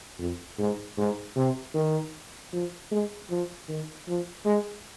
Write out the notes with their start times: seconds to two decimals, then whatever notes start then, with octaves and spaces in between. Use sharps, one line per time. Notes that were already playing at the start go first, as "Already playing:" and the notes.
0.19 F2
0.58 G#2
0.98 G#2
1.36 C3
1.74 D#3
2.53 F3
2.91 G#3
3.30 F3
3.69 D#3
4.08 F3
4.46 G#3